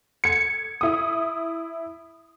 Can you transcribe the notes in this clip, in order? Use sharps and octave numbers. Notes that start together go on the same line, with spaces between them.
G#6 C#7
E4 D#6